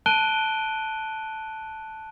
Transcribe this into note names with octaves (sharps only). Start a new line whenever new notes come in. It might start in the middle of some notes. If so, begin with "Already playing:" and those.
A5 F#6 D7 D#7 G7